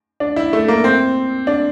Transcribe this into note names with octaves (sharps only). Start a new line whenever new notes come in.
D4
E4
A3
A#3
C4
D4